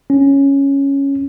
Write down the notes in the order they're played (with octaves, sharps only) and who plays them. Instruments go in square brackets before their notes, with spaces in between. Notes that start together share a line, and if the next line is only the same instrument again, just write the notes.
[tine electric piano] C#4